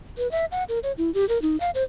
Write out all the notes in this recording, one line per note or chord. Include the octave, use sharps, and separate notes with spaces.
B4
E5
F#5
A#4
C#5
E4
G4
A#4
D#4
F5
C5